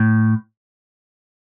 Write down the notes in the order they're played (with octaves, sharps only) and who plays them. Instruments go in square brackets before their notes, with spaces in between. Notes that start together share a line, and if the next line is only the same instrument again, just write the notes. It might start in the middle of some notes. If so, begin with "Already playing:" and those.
Already playing: [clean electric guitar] A2